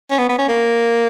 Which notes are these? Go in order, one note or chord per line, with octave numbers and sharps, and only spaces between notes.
C#4
B3
B3
C#4
A#3